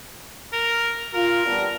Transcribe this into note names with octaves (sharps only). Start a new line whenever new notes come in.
A#4
F4 A#4
G3 B3 D4